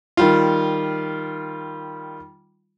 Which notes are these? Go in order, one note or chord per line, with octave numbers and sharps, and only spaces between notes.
D#3 G3 F4